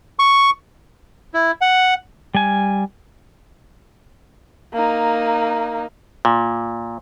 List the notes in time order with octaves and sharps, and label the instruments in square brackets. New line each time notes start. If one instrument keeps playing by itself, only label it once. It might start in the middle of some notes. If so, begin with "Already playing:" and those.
[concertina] C#6
E4
F#5
[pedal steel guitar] G3 G#5
[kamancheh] A#3 D#4
[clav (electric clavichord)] A#2